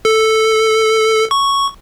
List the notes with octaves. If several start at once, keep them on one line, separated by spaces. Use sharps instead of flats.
A4
C#6